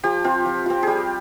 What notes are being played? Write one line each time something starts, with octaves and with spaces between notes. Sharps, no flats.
F3 G4
C4 F4
F3
C4 F4
G3 G4 G#4